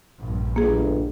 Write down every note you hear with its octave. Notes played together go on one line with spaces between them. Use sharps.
A#1 G2
G1 A#3 G#4